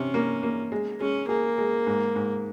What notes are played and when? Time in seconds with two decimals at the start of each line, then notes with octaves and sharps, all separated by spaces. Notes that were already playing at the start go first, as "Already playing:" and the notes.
Already playing: C3 C#4
0.14 A#3
0.43 A#3
0.72 G#3
1.01 G#3 C#4
1.28 A#3 G#4
1.58 G#3
1.87 G#2
2.16 G#2